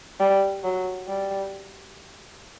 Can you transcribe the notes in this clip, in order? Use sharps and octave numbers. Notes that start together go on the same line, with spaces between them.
G3
F#3
G3